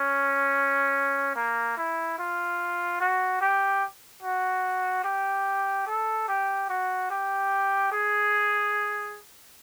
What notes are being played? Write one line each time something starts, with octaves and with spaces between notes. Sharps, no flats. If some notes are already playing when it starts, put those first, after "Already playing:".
Already playing: C#4
A#3
E4
F4
F#4
G4
F#4
G4
A4
G4
F#4
G4
G#4